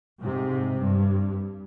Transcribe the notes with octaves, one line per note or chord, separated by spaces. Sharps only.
G#2 C3
G2